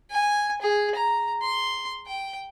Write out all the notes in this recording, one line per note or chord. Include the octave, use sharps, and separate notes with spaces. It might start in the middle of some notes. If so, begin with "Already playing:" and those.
G#5
G#4
A#5
C6
G5